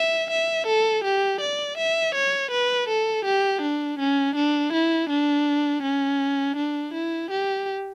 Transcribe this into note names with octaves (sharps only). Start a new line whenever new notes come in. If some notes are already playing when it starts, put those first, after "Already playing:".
Already playing: E5
E5
A4
G4
D5
E5
C#5
B4
A4
G4
D4
C#4
D4
E4
D4
C#4
D4
E4
G4